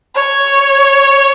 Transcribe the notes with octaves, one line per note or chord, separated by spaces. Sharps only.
C#5